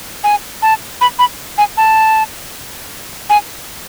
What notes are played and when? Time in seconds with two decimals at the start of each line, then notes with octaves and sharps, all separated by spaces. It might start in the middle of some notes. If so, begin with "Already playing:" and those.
0.24 G#5
0.62 A5
1.01 B5
1.19 B5
1.58 G#5
1.77 A5
3.30 G#5